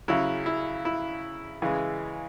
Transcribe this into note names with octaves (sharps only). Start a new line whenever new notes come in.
C#3 F#3 E4
E4
E4
C#3 E3 G#3